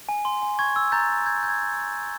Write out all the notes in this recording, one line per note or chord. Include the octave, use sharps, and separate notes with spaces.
G#5
C6
G#5
C#6 G#6
E6
A#5 G6 A6
A#5
G6 G#6
G6
G#6